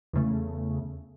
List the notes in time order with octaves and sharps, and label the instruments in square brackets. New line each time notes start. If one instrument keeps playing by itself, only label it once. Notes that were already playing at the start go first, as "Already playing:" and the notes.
[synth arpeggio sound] E2 C#3 A3